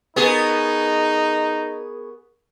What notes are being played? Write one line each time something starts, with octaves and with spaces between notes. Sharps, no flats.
B3 D#4 G#4 A#4 C#6